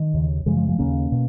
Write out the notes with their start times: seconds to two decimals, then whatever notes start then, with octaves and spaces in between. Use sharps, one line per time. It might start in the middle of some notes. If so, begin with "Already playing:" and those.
Already playing: D#3
0.14 D#2 C#3
0.46 F#2 C#3 F3 G#3
0.57 F3 G#3
0.68 F3 G#3
0.79 D#2 C#3 A#3 C#4
1.12 B2